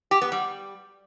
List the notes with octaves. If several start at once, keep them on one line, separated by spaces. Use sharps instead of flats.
G4
B3
G3